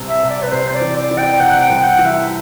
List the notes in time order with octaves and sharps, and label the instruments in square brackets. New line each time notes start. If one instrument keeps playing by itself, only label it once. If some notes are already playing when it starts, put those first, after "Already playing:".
Already playing: [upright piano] C2 C3
[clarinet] E5
[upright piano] C3
[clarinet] D5
B4
[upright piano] C3 [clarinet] C5
[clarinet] C5
D5
[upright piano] E3
[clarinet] D5
[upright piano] E3
[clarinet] G5
[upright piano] C3 [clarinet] F#5
[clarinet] F#5
G5
[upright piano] C2
[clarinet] F#5
[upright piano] E3
[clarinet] E5